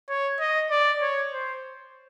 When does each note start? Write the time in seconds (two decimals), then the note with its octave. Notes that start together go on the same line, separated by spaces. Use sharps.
0.09 C#5
0.40 D#5
0.71 D5
1.02 C#5
1.33 C5